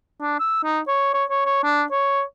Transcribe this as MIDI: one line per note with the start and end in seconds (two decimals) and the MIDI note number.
0.21 0.37 62
0.40 0.59 88
0.64 0.79 63
0.88 1.14 73
1.14 1.24 73
1.31 1.41 73
1.46 1.61 73
1.63 1.83 62
1.91 2.23 73